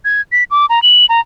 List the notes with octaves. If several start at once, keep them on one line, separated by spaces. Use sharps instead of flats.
G#6
B6
D6
A#5
F#7
A#5